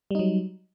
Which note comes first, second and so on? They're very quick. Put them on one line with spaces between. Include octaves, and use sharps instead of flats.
G3 D#4 F#3